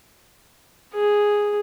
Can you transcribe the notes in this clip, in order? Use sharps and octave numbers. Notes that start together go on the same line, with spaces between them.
G#4